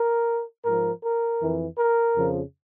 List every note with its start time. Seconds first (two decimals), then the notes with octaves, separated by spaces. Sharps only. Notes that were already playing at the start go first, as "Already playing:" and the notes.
Already playing: A#4
0.65 G#2 F3 A#4
1.03 A#4
1.40 F2 E3
1.77 A#4
2.14 F2 C#3 F3